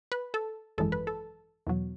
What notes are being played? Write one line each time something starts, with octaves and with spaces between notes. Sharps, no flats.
B4
A4
G#1 F#2 E3 G#3 A4
B4
A4
E2 B2 F#3